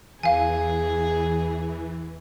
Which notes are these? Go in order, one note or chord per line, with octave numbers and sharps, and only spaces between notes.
E2 E3 G#4 F5 G#5